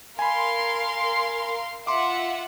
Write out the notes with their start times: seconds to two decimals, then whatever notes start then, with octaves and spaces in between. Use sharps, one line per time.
0.19 A#4 F5 G#5 B5 C6
1.87 F4 E5 F#5 C6 D6